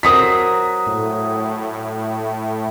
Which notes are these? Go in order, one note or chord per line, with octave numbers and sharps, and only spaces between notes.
F#3 C4 A#4 D#6 B6
A2